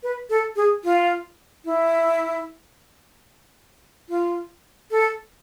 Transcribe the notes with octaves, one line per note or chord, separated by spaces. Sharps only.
B4
A4
G#4
F4
E4
F4
A4